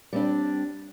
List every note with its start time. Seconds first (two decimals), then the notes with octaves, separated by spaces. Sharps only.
0.13 G3 C4 D4